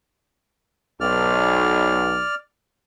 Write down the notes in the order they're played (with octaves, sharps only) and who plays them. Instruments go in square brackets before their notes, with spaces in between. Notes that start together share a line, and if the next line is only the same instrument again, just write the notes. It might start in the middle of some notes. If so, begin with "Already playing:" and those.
[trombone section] B1 [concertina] D5 F6